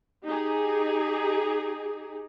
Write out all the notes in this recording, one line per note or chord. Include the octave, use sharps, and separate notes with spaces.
D#4 G4 G#4